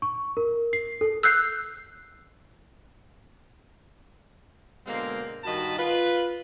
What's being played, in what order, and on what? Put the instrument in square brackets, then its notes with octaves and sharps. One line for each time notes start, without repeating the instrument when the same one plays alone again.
[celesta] C#6
A#4
C7
A4
[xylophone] E6 F#6 G6 C7
[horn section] B2 D3 G#3 A#3 C4 F5
G2 D#3 F#4 D#5 A5 B5
F4 B4